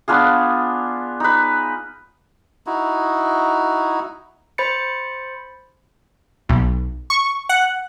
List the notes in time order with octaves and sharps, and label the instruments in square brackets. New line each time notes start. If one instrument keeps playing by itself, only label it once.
[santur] B3 D4 F4 G#4
D#4 B4
[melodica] D#4 E4 F#4
[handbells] C5 B5 A6 C#7
[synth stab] B1
C#6
F#5